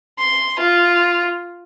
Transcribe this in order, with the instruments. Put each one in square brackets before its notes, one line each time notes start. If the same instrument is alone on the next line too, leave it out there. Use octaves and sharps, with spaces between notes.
[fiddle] C6
F4